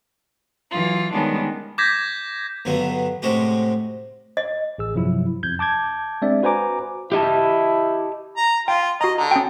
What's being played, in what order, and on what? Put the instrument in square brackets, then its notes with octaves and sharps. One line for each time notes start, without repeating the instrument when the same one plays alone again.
[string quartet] E3 F#3 F4
D#3 G3 G#3 B3 C#4 D4
[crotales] D6 G6 G#6 A#6 B6
[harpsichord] G2 D3 F#3 B3
A2 C3 G#3 F#4 G4
[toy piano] D#5
[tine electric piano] A1 G#4 E6
G2 C3 F3 F#3 E4
F2 G6 G#6
A5 D6 G6 G#6
G#3 C4 D4 D5 E5
F#4 B4 C5 G#5 A#5 D6
[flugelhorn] E4 [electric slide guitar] G4 D#5 A5
[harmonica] A#5
[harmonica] F4 [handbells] G5
[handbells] F#4 A#5 [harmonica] D#5
[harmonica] D3 [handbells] A#5
[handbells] C#4 G5